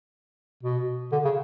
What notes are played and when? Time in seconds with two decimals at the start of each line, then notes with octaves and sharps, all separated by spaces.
0.63 B2
1.12 D3
1.25 C#3